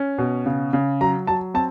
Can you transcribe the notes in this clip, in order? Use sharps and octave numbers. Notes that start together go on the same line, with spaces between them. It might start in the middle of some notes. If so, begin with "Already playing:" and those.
Already playing: C#4
B2
C#3
C#3
F#3 A#5
F#3 A5
C4 A5